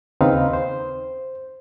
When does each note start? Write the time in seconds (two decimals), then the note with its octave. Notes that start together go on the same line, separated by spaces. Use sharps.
0.21 D#2 C#3 C4 D#4 B4 F5
0.53 C5